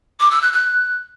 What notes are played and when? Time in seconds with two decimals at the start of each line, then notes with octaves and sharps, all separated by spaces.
0.19 D6
0.30 E6
0.41 F#6
0.52 F#6